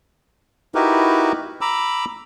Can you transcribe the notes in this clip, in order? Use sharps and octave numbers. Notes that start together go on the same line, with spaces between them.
D#4 E4 F#4 G4 A#4 B4
A#5 B5 D6 E6